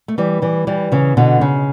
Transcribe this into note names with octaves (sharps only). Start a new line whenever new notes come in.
A3
E3 G3
E3 G3
E3 G3
C#3 E3
B2 D3
C#3